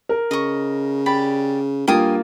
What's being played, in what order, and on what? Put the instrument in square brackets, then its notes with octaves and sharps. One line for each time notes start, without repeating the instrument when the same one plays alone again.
[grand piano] A#4
[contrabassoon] C#3 [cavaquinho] D#5 C#6
[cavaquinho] G4 D5 B5
[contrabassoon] G2 [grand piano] A#3 F4 [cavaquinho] G5 G#5 D#6